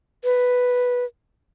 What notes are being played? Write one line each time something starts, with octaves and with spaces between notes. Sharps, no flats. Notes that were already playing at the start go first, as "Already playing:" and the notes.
B4